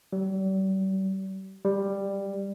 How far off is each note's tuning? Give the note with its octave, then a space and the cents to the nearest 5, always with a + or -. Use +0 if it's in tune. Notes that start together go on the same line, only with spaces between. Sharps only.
G3 -40
G3 +10